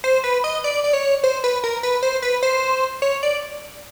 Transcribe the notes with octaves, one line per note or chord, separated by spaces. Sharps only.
C5
B4
D#5
D5
D5
C#5
C5
B4
A#4
B4
C5
B4
C5
C#5
D5